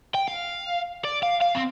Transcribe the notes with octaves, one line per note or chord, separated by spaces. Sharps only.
G5
F5
D5
F5
F5
C4